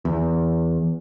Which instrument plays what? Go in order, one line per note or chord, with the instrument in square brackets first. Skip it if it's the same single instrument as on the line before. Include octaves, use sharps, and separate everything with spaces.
[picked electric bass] E2